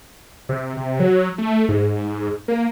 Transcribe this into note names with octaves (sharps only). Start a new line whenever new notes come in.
C3
C3
F#3
A3
G#2
A#3